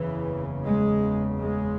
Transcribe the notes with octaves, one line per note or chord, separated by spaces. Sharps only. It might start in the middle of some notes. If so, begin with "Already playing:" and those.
Already playing: F#1 E2 C#3 E3
G#3
G#3